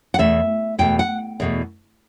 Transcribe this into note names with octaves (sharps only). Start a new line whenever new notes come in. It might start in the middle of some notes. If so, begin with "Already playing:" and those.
F#5
E2 B2 A3 E5
E2 B2 A3 G5
F#5
E2 B2 A3